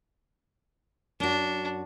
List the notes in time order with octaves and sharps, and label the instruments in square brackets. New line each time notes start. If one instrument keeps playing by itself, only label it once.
[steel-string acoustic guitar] F#2 F#4 [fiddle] D4